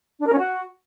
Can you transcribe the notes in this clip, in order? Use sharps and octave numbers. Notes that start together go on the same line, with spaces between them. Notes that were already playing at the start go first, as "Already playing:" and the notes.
D4
A#4
C#4
F#4